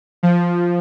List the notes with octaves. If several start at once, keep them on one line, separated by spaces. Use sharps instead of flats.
F3